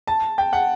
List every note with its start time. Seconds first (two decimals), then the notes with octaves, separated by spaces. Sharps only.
0.07 A5
0.38 G5
0.53 F#5